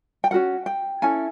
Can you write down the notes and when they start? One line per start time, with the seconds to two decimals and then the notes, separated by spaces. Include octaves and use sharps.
0.24 G5
0.31 C#4 F#4 A#4 F#5
0.66 G5
1.02 C#4 E4 A4 G#5